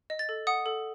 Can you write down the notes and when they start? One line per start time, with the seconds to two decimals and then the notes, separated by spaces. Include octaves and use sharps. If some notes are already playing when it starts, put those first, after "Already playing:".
0.10 D#5
0.19 A6
0.29 A4
0.47 F#5 D#6
0.66 A4